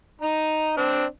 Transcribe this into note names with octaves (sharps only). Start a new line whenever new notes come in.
D#4 A#5
C4 D4